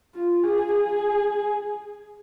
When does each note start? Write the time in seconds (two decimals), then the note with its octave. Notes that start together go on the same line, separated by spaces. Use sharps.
0.15 F4
0.44 G#4
0.73 G#4